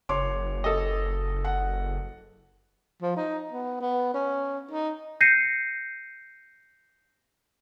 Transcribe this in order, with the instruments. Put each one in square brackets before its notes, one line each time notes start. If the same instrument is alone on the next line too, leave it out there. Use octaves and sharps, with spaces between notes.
[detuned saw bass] F#1 [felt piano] C#5 C6 D6
[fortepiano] A4 D#5
[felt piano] F#5
[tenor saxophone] F3
D#4
B3
B3
C#4
D#4
[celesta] G6 A#6 C7 C#7 D#7